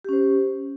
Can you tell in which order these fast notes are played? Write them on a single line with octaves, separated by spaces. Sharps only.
G4 C#4 C5